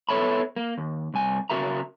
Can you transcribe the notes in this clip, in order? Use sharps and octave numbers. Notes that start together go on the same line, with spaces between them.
B3 A4 C#5 E5 A5 B5
A#3
D#2
C2 G#5
C#3 F#3 F#4 A#4 E5 A#5